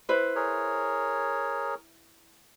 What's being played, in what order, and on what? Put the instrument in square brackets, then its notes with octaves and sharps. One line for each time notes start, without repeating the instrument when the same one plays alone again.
[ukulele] E4 B4 C5
[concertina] G#4 A#4 C#5